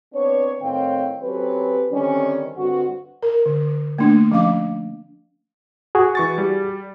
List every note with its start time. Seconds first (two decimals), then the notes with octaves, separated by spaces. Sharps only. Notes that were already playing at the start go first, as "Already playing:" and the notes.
0.14 B3 C4 D4 C#5
0.61 A2 D#3 C4 C#5 F5 G5
1.21 F#3 C4 C#4 G4 A4 B4
1.91 D3 D#3 G3 C4 C#4
2.57 G2 D3 C4 F#4
3.23 A#4
3.46 D3
3.98 A3 A#3 D4
4.32 F3 C#4 F5 D6
5.95 F#4 G#4
6.15 E3 C#6 A6
6.38 G3